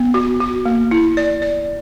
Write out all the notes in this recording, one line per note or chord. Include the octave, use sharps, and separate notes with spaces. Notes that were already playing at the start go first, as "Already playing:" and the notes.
Already playing: B3
F#4
F#4
A#3
E4
D5
D5